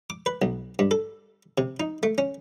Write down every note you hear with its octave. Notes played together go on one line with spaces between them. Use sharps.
D6
B4
B1
G2
A4
C3
D#4
A3
C#4